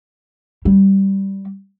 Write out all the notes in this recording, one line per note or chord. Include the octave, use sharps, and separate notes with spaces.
G3